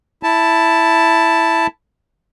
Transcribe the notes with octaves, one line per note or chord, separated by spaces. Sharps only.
E4 A5